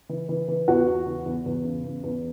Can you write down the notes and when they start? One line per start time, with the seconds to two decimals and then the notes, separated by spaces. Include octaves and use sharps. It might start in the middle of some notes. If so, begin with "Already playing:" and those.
0.09 E3
0.29 E3
0.48 E3
0.68 E2 F#4
0.87 E2
1.07 E3
1.26 E2
1.46 E2
1.65 C#3
1.84 E2
2.03 E2